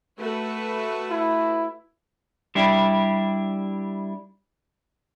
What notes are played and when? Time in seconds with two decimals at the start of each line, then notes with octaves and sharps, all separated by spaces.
0.18 A3 F#4 B4
1.11 E4
2.55 G3 D4 E4 G4